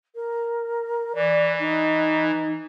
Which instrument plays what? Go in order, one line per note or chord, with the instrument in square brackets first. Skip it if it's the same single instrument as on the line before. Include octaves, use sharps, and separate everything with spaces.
[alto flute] A#4
[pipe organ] E3 [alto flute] D5
[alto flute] D#4